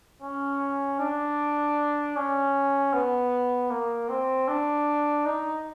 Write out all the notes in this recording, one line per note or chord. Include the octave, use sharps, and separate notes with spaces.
C#4
D4
C#4
B3
A#3
C4
D4
D#4